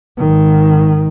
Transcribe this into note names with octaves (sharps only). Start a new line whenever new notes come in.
G#1 D#3